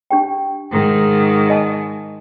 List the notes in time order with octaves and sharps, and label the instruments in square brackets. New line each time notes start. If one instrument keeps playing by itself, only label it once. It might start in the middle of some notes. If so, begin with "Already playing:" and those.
[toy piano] D4 G4 G5
[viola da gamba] G#2 D#3
[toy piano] D#5 G#5 A5